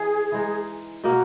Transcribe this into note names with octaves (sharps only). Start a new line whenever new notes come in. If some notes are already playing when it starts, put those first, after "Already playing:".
Already playing: E3 D#4 G#4
E3 G#3 D#4
B2 A#3 D#4 F#4